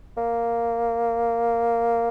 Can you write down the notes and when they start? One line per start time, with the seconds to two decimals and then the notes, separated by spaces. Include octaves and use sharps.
0.17 A#3